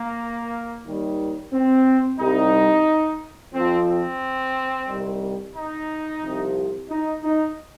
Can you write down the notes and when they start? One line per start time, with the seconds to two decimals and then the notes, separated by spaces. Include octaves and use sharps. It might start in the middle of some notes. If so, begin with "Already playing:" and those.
Already playing: A#3
0.86 D#2 D#3 G3
1.53 C4
2.20 C2 C3 G3 D#4
3.54 F2 F3 C4
3.88 C4
4.88 C2 C3 D#3 G3
5.55 D#4
6.23 C2 C3 F3
6.90 D#4
7.23 D#4